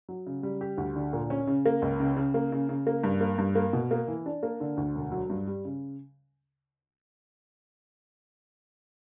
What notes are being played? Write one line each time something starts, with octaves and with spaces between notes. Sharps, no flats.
F#3
C#3
G3
G4
D2
D3
A#2
C#4
C#3
A#3
C#2
C#3
C#3
A#3
C#3
C#3
A#3
G2
A#3
G2
A#3
B2
A#3
E3
D4
A#3
D3
D2
E1
F#3
G2
G3
C#3